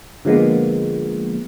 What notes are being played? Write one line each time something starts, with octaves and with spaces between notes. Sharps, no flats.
D3 F3 G#3 A#3 B3